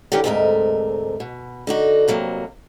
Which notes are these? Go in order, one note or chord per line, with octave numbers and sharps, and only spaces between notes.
D3 E3 C#4 G4 A#4
D2 G#2 C3 G#3 A3 A#4
B2
D3 D#4 F#4
F2 C3 F#3 A#3